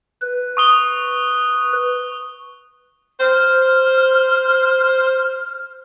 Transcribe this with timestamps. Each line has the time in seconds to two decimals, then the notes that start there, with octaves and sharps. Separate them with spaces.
0.22 B4
0.57 C#6 D#6 G7
3.20 C5 F6